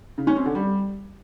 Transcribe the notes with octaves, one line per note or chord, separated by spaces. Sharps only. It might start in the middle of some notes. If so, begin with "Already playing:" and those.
C#3
C#4
C4
D3
G3